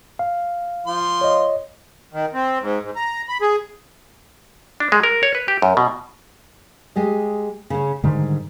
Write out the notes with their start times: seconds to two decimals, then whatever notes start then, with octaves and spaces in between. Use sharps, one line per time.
0.19 F5
0.87 F3 F4 C6
1.21 C#5 D#5
2.13 D#3
2.33 C4
2.61 G#2
2.82 G#2
2.96 A#5
3.29 B5
3.41 G#4
4.80 D4
4.92 G#3
5.03 A#4
5.23 C#5
5.35 B4
5.48 G4
5.62 F#2
5.77 B2
6.96 G#3 G4 D#5
7.70 C#3 C#4
8.04 G#2 D3 D#3 G3